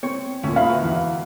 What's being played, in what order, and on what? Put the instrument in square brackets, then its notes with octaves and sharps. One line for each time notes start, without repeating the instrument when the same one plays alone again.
[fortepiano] C4 [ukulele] C#5
[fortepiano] D2 A#2 [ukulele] C#4
[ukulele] D#4 E5 B5 [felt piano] F5
[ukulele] F#4 B4
[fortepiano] E2